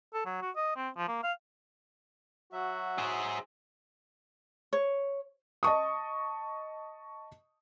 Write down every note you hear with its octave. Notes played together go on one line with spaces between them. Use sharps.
A4
F#3
F#4
D#5
C4
F3
A#3
F5
F#3 F#4 E5
G#4 C5
C#5
D#5 A5 C#6 D#6